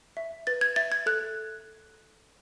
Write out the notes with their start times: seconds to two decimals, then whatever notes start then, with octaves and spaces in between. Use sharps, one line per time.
0.17 E5
0.47 B4 A6
0.61 G#6
0.76 E5 A6
0.92 G#6
1.06 A4 F#6